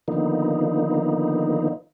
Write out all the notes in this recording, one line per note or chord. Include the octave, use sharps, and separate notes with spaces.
D3 D#3 F3 A#3 B3 D#4